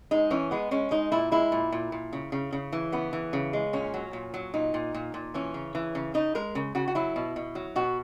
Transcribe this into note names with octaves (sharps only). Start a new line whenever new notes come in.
G#3 D#4
E3 C#4
G#3 B3
G#3 C#4
G#3 D#4
A#2 E4
G#3 E4
A#2
A#2
A#2
C#3
C#3
C#3
E3
C#3 B3
E3
C#3
G#3
A#2 C#4
F#3
A#2
F#3
A#2 D#4
A#2
A#2
A#2
E3 C#4
C#3
E3
C#3
C#3 D#4
G#3 A#4
C#3
C#3 F#4
F#4
F#3 E4
B2
B2
F#3
B2 F#4